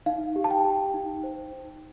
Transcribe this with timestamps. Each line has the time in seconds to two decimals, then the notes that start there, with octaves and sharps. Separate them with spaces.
0.06 D#4 F5
0.36 G4
0.44 A5
0.51 G5
0.65 G4
0.94 D#4
1.24 C5
1.53 D#4